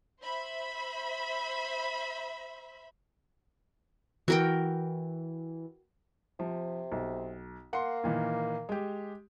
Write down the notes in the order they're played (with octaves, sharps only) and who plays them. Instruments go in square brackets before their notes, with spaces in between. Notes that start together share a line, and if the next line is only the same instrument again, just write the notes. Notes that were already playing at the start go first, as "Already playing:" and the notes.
[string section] C5 E5 B5
[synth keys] E3 [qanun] F#4 A#4 G5
[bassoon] C3 [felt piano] F3
[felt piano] B1
[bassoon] A#3 [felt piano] F#5 C6
[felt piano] A#2 D#3 E3
G#3 G4